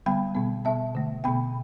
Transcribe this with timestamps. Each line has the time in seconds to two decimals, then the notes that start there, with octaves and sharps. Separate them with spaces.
0.06 D3 G3 B3 G5 B5
0.35 B2 G3 B3
0.65 B2 B3 E5 A5
0.95 D3 A3
1.24 B2 B3 G5 B5